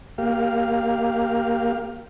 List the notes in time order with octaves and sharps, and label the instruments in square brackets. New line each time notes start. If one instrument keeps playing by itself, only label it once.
[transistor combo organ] A#3 G4 F5